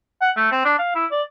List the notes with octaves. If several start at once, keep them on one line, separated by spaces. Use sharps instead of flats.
F#5
A3
C4
D4
F5
E4
D5